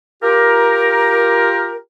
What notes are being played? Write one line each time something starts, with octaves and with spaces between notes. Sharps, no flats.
F4 G4 A#4